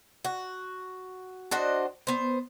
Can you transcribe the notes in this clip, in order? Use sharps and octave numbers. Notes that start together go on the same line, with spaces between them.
F#4
D4 F#4 C5 D#5
B3 C5